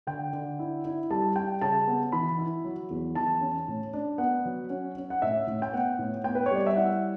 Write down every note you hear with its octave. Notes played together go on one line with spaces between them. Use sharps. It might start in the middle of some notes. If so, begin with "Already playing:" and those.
D3 G5
D3
E4
E4
G3 A5
G3 G5
C#3 A5
B3
E3 B5
E4
F#3
E2
E3 A5
C#4
A2
D4
B3 F#5
F#3
C#4
C#4
F#5
A2 E5
A2
G5
B3 F#5
A2
B3 G5
B4
C#5
G3 D5
E5
E4 F#5